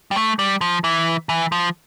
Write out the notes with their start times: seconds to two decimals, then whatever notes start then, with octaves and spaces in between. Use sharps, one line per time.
0.11 G3
0.16 A3
0.39 G3
0.61 F3
0.84 E3
1.29 E3
1.52 F3